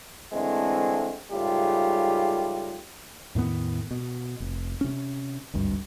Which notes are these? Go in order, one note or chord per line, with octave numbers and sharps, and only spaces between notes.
D3 E3 G#3 A3 C4
G#2 C#3 G3 A3 F4 G4
E2 A2 D#3 B3
B2
F1
C3 C#4
G#1 D2 G2